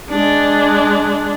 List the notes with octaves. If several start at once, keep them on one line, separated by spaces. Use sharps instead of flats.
G#3 D4